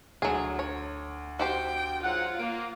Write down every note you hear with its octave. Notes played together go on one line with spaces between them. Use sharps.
D2 F#3 G#4
C#5
F#4 G4 C5 G5
G#2 F#3 F4 F#5
A#3 D7